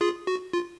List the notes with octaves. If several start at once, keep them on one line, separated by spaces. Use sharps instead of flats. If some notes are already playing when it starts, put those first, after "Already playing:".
F4 G#4
F#4
F4